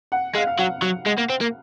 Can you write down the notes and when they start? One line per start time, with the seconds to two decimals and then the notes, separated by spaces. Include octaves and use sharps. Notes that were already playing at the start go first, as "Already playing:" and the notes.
0.12 F#5
0.35 G#3 F5
0.47 F5
0.59 F#3 F#5
0.82 F#3
1.06 G#3
1.18 A#3
1.29 C4
1.41 A#3